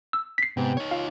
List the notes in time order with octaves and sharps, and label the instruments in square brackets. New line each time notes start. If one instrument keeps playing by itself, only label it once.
[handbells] E6
B6 C7
[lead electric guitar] G#2 [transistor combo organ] C3 B3 G5
[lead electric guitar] D#4 C#5
[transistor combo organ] F4 [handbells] F5